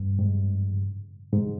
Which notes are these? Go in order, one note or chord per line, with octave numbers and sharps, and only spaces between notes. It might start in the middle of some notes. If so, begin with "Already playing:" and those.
Already playing: G2
G#2
G#2